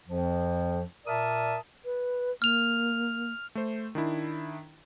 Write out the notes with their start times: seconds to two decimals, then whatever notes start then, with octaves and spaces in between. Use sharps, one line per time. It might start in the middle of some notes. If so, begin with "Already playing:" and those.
0.08 F2 F3
1.06 A#2 A#4 D5 E5 A5 D#6
1.85 B4
2.42 A#3 F6 F7
3.55 A3 C5
3.95 D#3 D4 E4